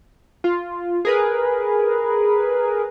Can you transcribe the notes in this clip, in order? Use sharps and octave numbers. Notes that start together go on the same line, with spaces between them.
F4
G#4 A#4 B4